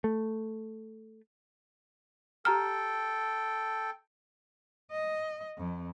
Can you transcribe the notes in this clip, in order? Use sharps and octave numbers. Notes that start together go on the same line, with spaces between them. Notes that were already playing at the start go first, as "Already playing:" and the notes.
A3
G4 A4 G5 A#5 F6
D#5
F2